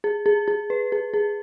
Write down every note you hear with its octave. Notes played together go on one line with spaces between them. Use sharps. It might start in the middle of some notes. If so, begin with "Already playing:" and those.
G#4
G#4
G#4
B4
G#4
G#4